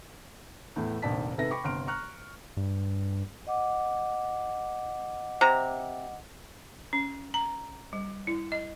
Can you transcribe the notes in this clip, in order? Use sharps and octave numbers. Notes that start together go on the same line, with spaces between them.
E2 A2 A3
F1 A#1 D#3 D5 A5 B6
G#2 C3 A4 B4 E5 A#6
G5 B5 C#6 D6 A#6
G1 C3 C6 F6 D7
A#5 C#6 F6 F#6
G2
D#5 F#5 D6
C3 A#5
C#4
A#5
G3
E4
D#5